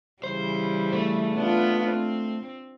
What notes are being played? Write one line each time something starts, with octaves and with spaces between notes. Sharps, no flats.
C#3 E3 G3 C5
A3
B3 D4 F4
C4